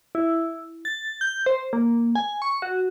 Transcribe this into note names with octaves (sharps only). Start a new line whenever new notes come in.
E4
A6
G6
C5
A#3
G#5
C#6
F#4